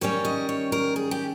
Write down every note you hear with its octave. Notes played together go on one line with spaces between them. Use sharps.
D#3 G3 C#4 C#5
D#5
C#5
A#4
G#4
G4